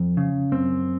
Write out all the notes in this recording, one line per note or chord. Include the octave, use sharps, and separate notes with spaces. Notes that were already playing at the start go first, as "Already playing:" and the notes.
Already playing: F2
C#3
F#2 C4